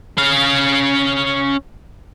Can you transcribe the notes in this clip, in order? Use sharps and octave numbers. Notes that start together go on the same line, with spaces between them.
C#4 F5